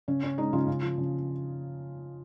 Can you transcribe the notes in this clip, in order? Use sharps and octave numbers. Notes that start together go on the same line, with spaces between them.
C#3 C#4
C#4
G#3 D#4
C#3 F4
C#3
F3
C#3